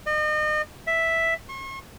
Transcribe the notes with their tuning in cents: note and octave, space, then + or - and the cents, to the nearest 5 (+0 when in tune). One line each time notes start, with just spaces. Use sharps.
D#5 -35
E5 +0
C#6 -45